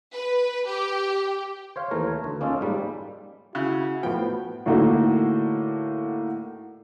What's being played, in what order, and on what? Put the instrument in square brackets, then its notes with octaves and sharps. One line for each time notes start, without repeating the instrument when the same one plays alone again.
[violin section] B4
G4
[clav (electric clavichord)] C5 C#5 F5
D#2 E3 A3 A#4 C#5
D2
A#3 C#4 D#4 F4 A4
G#2 G3 A#3
[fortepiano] C#3 [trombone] E4 [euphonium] F#4
[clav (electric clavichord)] A2 F3 [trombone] B3 [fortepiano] G5
[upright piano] A2 D3 A#3 D#4 F#4